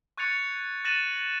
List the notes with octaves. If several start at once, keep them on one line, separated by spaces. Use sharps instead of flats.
C#6 F#6 G#6 A6 C#7 F7
F#6 A6 A#6 D#7 E7 F#7